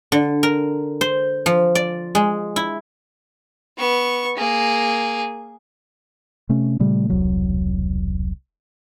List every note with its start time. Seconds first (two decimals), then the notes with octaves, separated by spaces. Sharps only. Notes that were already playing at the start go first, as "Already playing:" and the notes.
0.12 D3
0.43 A#4
1.01 C5
1.46 F3
1.75 D5
2.15 G#3
2.56 E4
3.77 B3 C#6
4.37 A#3 G#4
6.49 C3 A3 C#4
6.79 A#2 C#3 G3 A3
7.10 E1 C2 F#3